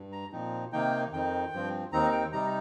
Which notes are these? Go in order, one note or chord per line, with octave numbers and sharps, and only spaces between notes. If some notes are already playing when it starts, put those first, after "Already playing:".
Already playing: G2
A#5
A#2 F3 C4 D#4
C3 D#3 A#3 D#4 G5
F2 D#3 C4 D#4 G5
G2 F3 C4
D#2 D#3 C4 D#4 A#5
G5
C3 G3 D#4 A#5